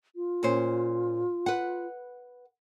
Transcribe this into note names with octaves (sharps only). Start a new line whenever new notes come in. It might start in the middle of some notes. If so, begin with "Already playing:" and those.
F4
A#2 C#4 C5
B4 F#5